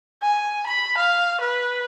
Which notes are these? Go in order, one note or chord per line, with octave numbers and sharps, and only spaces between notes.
G#5
B5
F5
B4